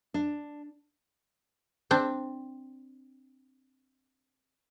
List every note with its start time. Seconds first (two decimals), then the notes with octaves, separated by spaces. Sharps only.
0.14 D4
1.91 C4 D4